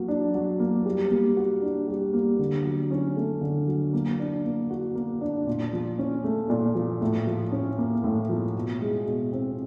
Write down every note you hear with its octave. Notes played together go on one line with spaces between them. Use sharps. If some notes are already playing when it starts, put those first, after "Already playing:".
Already playing: F#3 A#3
D4
F#3
A#3
G3
A#3
F#4
D4
G3
A#3
D3
F#3
C#4
A3
D3
F#3
A#3
D4
A#3
F#4
A#3
D4
A#2
F3
C#4
A3
A#2
F3
A2
F3
C#4
A#3
A2
F3
B2
G#3
B2
C4